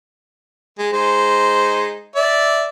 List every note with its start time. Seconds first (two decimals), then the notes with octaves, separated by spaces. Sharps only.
0.79 G#3
0.93 G#3 D#4 C5
2.16 D5 E5